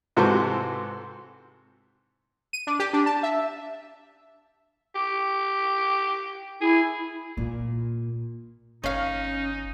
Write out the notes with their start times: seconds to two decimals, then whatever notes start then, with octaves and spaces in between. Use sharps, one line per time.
0.17 G#2 C3 E3 F#4 A4 C5
2.53 D#7
2.67 D4
2.79 G4
2.93 D4
3.06 A5
3.23 E5
4.95 G4
6.61 E4 G#4
7.37 A#2
8.84 G1 C#4 D#4 F5